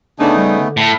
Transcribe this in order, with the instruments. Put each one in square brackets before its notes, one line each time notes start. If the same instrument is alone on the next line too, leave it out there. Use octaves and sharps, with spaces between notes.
[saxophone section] C#3 D#4 [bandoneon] A3 B3 [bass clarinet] D4
[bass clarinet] G3
D3
[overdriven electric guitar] A2